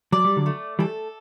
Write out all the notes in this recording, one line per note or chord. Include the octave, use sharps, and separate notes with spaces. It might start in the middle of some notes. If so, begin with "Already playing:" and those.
F#3 D5
G3
D3 F#3
A3
E3 G3 A4